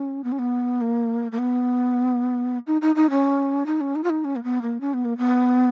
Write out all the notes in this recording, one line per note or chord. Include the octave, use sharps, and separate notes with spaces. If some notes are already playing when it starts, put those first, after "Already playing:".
Already playing: C#4
B3
C#4
B3
A#3
A#3
B3
D#4
D#4
D#4
C#4
D#4
C#4
D#4
F4
D#4
C#4
A#3
B3
A#3
C#4
B3
A#3
B3